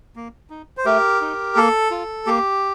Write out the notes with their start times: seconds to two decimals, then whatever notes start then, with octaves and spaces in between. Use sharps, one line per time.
0.16 A#3
0.50 D#4
0.77 C5
0.85 A3 G4 A#4
1.21 D#4
1.56 A#3 A4
1.91 F4
2.26 A#3 G4